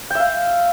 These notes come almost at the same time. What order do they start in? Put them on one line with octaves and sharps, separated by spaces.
G5 E5 F5